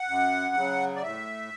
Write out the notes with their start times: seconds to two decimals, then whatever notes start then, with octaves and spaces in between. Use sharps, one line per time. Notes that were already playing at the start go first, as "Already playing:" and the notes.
Already playing: F#5
0.08 F#2
0.55 C#3 F#3
0.96 D5
1.02 A2 E5